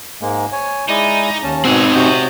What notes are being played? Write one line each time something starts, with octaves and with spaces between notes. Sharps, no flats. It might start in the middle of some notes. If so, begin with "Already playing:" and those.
G#2 G#3 A#3
C#5 G#5
G#3 D#4 E4 D5
D#2 C#4 A5
D2 B2 C4 D#4 G#4 F#5 E6
C3 F#4 C#5 D#5 G6